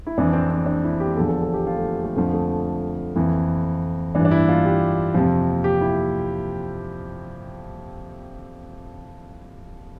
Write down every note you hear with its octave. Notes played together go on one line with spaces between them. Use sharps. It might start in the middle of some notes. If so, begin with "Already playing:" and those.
E4
F2 E3 D4
C4
C4
D4
E4
G4
E2 D3 F3 A4
A4
A4
G4
F4
A3
A3
F2 D3 F3 A3
A3
F2 E3 E4
G2 E3 D4
D4
E4
F4
G4
F2 C3 F3
G4
E4